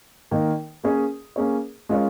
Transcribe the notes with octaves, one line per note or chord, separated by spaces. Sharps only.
D#3 A#3 D#4
A#3 C#4 G#4 C#5
A#3 C#4 G#4 C#5
G#3 C#4 F4 A#4 C#5